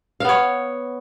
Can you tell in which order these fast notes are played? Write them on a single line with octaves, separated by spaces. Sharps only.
F5 B3 C#5